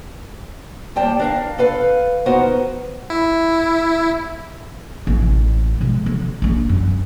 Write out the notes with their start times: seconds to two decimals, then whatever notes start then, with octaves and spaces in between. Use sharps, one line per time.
0.96 D#2 G3 G5 A5
1.19 D4 A#4 F5
1.58 A4 B4 F5
2.26 B3 D#4 F#4 A#4 C5
3.10 E4
5.07 A1
5.81 B2 G#3
6.06 D3
6.42 A#1 D4
6.69 F#2